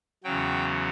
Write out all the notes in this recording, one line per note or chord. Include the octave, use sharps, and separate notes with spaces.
E2 C#3 F#3 G5